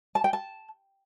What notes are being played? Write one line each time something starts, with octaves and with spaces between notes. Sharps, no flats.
A5
G5
A5